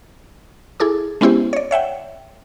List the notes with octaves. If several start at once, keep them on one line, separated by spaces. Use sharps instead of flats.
E4 G#4 A4 D6
G#3 B3 C#4 E4 G4 C5
C#5 D5
C#5 E5 F#5 G5